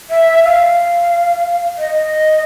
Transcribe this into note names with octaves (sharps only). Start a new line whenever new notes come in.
E5
F5
D#5